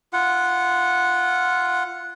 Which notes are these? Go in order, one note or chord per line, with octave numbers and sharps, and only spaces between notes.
F4 F#5